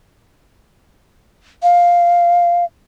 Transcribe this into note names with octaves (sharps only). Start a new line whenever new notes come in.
F5